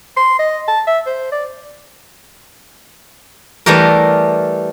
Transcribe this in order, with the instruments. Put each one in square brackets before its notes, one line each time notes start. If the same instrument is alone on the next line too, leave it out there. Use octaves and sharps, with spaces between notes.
[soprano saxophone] C6
D#5
A5
E5
C5
D5
[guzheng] E3 G3 A3 G4 A#4